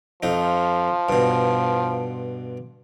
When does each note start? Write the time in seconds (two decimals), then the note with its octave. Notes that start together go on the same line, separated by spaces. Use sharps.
0.23 F2 F3 D#4
1.09 G2 B2